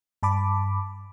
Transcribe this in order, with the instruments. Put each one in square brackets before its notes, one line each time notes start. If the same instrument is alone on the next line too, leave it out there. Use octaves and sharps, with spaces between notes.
[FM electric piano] G2 A5 B5 D6